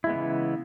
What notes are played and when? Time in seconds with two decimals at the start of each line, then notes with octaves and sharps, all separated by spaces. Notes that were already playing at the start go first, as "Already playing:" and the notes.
0.04 E4
0.07 G#3
0.09 B3
0.12 E3
0.15 C#3